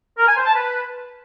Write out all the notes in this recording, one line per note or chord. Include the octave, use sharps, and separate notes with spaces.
A#4
G#5
C5
A5
B4